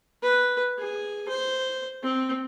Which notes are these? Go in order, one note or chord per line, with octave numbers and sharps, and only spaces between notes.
B4
G#4
C5
C4